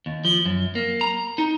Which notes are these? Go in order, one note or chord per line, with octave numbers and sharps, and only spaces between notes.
D#2
F3
F#2
A#3
A#5
D#4